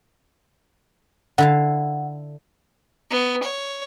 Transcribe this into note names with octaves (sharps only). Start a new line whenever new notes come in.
D3 E4 F5 F#5
B3
C#5